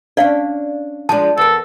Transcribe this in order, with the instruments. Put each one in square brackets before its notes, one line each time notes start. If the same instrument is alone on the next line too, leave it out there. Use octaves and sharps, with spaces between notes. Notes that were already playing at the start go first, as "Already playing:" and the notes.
[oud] C#4 D4 [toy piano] D5 F5
[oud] F3 G#3 D4 [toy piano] A5
[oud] E2 A#4 [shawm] A4